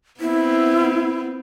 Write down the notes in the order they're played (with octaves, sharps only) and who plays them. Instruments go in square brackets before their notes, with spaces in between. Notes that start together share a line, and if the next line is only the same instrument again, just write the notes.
[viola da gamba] B3 C4 [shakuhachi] E4